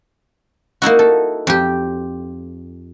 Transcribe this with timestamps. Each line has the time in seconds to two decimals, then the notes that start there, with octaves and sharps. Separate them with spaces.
0.82 A#3 D#4 E4 F#4
0.99 A4
1.47 F2 G4